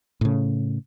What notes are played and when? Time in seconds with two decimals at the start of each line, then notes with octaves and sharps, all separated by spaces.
0.21 A2 C#3